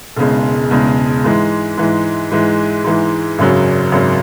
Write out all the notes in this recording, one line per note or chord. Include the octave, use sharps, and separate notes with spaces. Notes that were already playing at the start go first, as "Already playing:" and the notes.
E1 E2 C#3 G#3
E1 E2 C#3 G#3
G#2 E3 G#3
G#2 E3 G#3
G#2 E3 G#3
G#2 E3 G#3
G#1 F#2 C#3 F#3
G#1 F#2 C#3 F#3